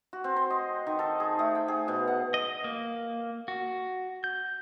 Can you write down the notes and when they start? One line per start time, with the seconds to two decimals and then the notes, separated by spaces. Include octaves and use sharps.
0.13 F#4
0.24 C4
0.37 C6
0.50 D#5
0.87 D#3
0.99 A4
1.20 G#4
1.39 A3
1.55 G5
1.68 G#4
1.88 B2
2.07 F#5
2.34 D#5
2.64 A#3
3.48 F#4
4.24 G6